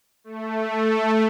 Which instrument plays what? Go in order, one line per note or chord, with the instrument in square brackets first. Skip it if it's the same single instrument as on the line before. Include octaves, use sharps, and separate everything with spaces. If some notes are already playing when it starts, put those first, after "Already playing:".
[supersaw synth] A3